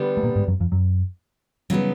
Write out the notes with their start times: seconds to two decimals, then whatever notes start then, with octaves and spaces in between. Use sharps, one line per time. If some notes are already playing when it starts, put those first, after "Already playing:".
Already playing: D3 G3 B3 D4
0.17 A3
0.23 A#2 A#3
0.36 G#2 G#3
0.48 F#2 F#3
0.60 F2 F3
0.72 F#2 F#3
1.70 C#3 F#3 G3 B3 D#4